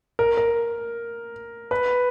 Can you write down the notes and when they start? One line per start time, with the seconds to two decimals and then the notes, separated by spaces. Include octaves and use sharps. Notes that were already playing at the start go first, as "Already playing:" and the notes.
0.19 A#4
0.37 A#4
1.71 B4